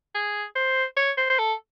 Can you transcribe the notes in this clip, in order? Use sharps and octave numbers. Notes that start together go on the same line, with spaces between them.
G#4
C5
C#5
C5
C5
A4